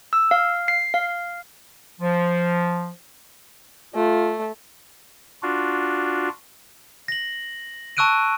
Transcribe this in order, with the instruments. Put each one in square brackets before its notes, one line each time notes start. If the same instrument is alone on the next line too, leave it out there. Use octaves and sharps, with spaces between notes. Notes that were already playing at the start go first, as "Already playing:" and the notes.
[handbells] E6
F5
C7
F5
[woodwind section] F3
[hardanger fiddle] A3 [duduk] F4
[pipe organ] D4 F4 F#4
[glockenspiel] A#6 F#7
A5 C#6 E6 F#6 D7 D#7